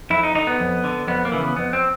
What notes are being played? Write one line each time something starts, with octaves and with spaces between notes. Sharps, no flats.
F2 E4
D#4
D3 D#4
B3
F2
D3
F2 B3
A#3
C#3 E3
B3
F2 B3
C4